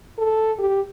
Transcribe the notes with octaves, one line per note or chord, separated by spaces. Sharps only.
A4
G4